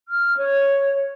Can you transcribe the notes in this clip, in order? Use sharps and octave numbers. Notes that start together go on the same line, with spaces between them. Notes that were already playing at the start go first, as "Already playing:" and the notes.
F6
C#5